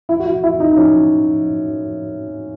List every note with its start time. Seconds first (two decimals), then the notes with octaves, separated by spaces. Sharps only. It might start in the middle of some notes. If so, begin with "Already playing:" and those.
0.09 E4
0.20 F#4
0.26 E4
0.43 E4
0.60 D#4
0.72 D#4
0.77 C#4